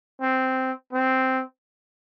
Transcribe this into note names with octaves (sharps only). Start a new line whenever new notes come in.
C4
C4